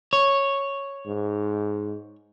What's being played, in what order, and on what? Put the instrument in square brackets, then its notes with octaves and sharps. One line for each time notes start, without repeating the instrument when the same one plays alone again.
[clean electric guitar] C#5
[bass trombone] G#2